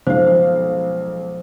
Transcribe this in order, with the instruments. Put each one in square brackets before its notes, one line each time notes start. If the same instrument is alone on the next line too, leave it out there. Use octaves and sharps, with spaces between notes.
[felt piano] B1 F5 [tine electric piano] F3 G#3 [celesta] C5